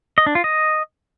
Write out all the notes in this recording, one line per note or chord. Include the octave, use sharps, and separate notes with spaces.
D#5
D4
F4
D#5